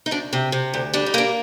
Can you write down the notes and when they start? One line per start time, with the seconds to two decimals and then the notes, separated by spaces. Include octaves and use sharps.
0.06 D#4
0.11 D2 D4
0.33 C3
0.52 C3
0.74 D2
0.94 G3 D4
1.06 D#4
1.14 A#3 D4